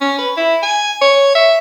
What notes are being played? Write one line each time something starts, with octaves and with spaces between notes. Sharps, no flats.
C#4
B4
E4
G#5
C#5
E5